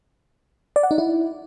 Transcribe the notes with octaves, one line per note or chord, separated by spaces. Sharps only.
D5
F#5
D#4
E4